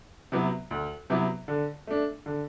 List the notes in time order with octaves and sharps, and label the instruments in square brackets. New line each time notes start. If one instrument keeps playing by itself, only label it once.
[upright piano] C3 F#3 B3 E4
D2
C3 F#3 B3 E4
D3
A3 D4
D3